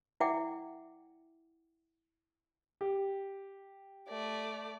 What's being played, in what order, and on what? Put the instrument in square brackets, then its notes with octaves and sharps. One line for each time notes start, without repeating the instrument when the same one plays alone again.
[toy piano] E4 D5 E5 F#5 G5 D6
[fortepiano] G4
[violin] A3 D5